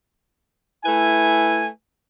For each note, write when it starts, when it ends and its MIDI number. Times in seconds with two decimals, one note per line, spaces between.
0.85 1.66 57
0.85 1.66 64
0.85 1.66 71
0.85 1.66 80